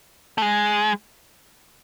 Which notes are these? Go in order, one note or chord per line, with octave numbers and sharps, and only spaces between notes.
A3
G#3